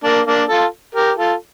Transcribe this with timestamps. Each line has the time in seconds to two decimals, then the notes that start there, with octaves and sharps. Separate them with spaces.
0.04 A#3 D4
0.27 A#3 D4
0.49 F4 A4
0.95 G4 A#4
1.18 F4 A4